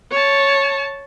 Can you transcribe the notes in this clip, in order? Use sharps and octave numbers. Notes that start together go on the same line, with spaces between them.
C#5 A5